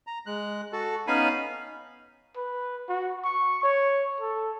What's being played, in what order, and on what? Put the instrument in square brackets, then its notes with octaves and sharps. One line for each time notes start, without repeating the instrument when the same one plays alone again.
[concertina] A#5
G#3 F#6
F#4 A4
B3 C#4 D#4 F5 G#5 B5
[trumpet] B4
F#4
C#6
C#5
A4